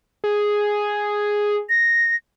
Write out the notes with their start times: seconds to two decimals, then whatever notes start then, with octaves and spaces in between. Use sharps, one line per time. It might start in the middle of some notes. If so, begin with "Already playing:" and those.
0.24 G#4
1.69 A#6